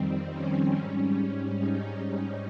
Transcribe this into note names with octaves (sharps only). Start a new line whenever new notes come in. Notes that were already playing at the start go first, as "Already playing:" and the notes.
Already playing: F2 D#3 G3 C4
C#4
G#2 G3
D#4
C#4